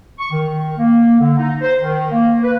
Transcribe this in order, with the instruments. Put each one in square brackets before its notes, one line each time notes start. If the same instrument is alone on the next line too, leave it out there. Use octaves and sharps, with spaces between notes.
[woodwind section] C#6
D#3
A#3
D3
D#4
C5
D#3
A#3
B4